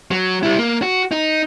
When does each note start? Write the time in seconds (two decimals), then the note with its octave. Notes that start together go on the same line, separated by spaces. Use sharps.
0.11 F#3
0.43 G3 E4
0.59 A#3
0.82 F#4
1.12 D#4